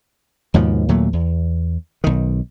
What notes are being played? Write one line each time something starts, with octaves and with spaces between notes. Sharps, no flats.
D#2 G#2 B2 F3
D#2 A#2 F#3 A3
E2
B1 D#3